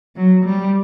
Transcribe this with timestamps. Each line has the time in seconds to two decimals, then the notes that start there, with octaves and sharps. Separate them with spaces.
0.17 F#3
0.45 G3